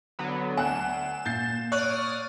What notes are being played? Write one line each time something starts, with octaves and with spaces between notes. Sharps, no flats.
D3 F#3 B3
D2 G#5 A5 F#6 E7
A#2 G6 A6 C7
C#5 D5 C#6 D#6 F6 F#6